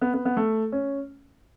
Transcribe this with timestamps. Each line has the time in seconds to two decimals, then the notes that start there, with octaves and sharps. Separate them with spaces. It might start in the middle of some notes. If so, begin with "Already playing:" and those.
0.01 B3
0.14 B3
0.25 B3
0.37 A3
0.72 C#4